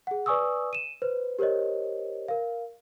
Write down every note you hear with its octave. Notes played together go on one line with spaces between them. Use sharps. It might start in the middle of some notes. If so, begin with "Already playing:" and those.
G#4 F#5
B4 D5 G#5 C#6 D#6 E6
D#7 E7
B4 C5
G4 A#4 C5 C#5 D#5
A#4 F5